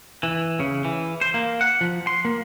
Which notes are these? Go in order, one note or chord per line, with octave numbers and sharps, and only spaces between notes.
E3
C#3
E3
C5
A#3
F#5
F3
C6
A#3